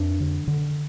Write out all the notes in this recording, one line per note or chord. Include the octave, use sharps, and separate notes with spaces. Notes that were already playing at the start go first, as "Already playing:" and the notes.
Already playing: F2 D4
D3
D3